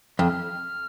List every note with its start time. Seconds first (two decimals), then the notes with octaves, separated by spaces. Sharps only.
0.19 F2
0.27 F6